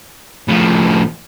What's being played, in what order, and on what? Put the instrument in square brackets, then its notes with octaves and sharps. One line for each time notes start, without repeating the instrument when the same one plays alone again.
[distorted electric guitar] A2 F3